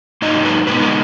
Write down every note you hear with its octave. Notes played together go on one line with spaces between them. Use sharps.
G#2 F#3 A#3 D#4 D#5
B4
B2 G#3 B3 D#4 B4
A#4